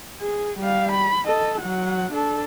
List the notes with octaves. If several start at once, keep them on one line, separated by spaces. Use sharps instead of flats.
G#4
G3 F5
B5
A4 D#5
F#3 F#5
D4 A4